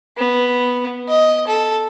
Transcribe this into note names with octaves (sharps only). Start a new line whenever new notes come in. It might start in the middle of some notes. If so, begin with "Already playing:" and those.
B3
D#5
A4